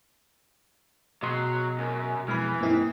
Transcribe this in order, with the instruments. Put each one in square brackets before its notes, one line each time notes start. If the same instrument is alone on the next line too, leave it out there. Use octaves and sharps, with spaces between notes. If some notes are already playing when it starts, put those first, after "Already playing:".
[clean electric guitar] B2 G#4 C6 [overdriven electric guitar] F#3 [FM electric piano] D#5
[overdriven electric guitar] F#2
[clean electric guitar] B1 F2 G#3 [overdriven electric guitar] E3 [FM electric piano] B5 F6
[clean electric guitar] G2 C4 D#4 [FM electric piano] A#3 E4